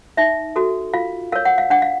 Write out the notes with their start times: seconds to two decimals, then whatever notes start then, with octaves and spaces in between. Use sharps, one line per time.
0.17 D#4 E5
0.56 F#4 A4
0.94 F4 F5
1.32 A#4 C#5 F5
1.45 F#5
1.58 F5
1.70 D4 F#5
1.82 F5